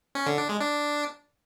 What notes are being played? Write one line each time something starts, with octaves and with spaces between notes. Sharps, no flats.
C#4
D3
D4
G#3
D4